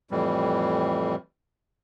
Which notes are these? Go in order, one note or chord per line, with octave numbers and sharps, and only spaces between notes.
F2 A2 E3 G3